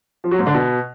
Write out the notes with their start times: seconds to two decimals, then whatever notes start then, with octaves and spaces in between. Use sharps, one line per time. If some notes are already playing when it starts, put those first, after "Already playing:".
0.24 F3
0.31 F#3
0.39 G#2
0.46 D3
0.54 B2